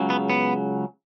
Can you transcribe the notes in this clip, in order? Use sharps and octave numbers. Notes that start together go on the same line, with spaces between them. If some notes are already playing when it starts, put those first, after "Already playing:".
Already playing: C#2 C#3 F#3
B3
B3